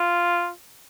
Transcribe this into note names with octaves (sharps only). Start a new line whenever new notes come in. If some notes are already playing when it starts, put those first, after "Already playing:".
Already playing: F4